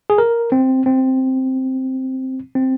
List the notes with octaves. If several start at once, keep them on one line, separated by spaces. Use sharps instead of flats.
G#4
A#4
C4
C4
C4